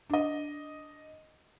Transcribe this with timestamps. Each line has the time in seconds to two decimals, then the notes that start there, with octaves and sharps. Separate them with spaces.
0.10 D4 D#5